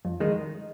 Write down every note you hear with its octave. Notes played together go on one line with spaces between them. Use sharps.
F2
D#3 G#3 D#4